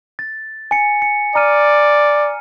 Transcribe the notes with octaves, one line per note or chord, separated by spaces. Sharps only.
A6
G#5 C#7
C#7
D5 A#5 F6 D#7